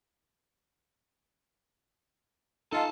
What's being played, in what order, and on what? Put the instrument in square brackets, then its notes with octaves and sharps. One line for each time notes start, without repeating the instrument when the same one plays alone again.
[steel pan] D#4 F5 [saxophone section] F4 A4 [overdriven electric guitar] G#5 A5